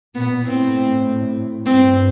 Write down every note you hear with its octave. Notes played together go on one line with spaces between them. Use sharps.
A#2 B3
A2 C4
G2 C4